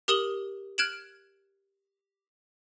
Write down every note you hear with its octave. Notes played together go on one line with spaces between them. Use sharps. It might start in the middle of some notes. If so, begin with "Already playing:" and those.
G4 A#4 D#6 E7 F#7 G7
F6 F#6 G#6 D7 E7 F#7